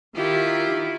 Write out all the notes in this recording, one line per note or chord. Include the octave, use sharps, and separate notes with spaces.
D#3 E4 F4 G4